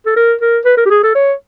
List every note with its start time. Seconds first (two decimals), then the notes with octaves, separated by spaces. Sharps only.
0.06 A4
0.16 A#4
0.41 A#4
0.65 B4
0.77 A#4
0.85 G4
0.90 G#4
1.03 A4
1.15 C#5